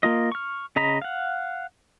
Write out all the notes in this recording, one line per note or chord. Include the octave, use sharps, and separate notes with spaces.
A#3 F4 D#5
C#6 F6
C#3 D#5 A#5 B5
F5 F#5